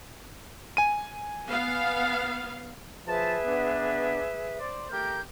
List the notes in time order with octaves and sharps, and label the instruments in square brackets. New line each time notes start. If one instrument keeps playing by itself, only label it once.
[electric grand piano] G#5 D#7
[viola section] B3 F5
[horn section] F3 A5 [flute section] G#4 B4 E5
[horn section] B3 D4
C5 D5
[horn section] A3 G4 A#4 [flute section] G6